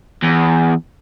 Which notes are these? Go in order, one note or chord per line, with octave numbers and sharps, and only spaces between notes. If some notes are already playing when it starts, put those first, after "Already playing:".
E2